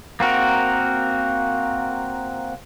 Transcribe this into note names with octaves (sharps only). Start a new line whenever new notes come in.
A#3 C4 F#4 A#4